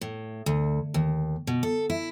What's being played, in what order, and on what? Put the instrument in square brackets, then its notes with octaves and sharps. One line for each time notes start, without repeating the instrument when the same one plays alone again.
[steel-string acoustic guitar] A2
D2
D#2
B2
A4
E4